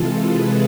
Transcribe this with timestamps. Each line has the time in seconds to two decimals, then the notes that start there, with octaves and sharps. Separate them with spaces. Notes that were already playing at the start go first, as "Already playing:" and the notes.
Already playing: C3 E3 G#3 F4 A4
0.16 G#4 B4